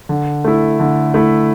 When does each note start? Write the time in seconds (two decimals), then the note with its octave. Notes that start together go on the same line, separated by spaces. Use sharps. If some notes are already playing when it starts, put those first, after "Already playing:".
0.09 D3
0.44 A3 E4
0.79 D3
1.14 A3 E4